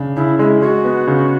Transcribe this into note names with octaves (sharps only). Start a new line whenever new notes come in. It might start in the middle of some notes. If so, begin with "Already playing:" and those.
Already playing: C#3 D4
C#3 E4
G#3 E4
G#3 F#4
B3
C#3